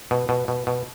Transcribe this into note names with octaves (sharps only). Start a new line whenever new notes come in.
B2
B2
B2
B2